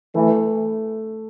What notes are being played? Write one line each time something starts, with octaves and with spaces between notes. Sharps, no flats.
E3 A3